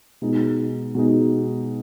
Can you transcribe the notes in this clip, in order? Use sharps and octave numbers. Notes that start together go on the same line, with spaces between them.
B2 G#3 D#4
B2 G#3 D#4